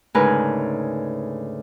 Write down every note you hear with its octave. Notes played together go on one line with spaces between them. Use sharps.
D2 G#2 C#3 A#4 B4 G#5